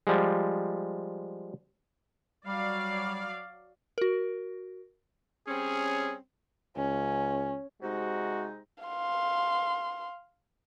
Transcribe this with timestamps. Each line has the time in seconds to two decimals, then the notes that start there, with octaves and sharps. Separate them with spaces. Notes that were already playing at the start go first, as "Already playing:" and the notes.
0.07 F3 G3 G#3
2.46 F#3 G3 D5 F5
3.98 F#4 A#4
5.47 G3 C4 C#4 G#4
6.76 C#2 C#4
7.82 C3 G#3 D#4 F#4
8.84 F5 C6